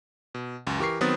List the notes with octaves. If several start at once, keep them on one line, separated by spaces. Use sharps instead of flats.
B2
C#2 F#2
E3 G4 A#4 C#6 C7
D#3 F#3 B3 C4 D#6 A6